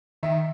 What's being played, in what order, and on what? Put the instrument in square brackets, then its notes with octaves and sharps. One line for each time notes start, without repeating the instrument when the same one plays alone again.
[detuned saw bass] D#3 [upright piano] E5